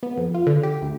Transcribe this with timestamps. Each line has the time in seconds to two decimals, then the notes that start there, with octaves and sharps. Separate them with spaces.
0.03 B3
0.17 F2
0.34 F4
0.46 D3
0.63 G4
0.82 D2